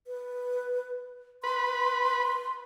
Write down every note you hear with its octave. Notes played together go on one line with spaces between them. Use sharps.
B4
B4 C6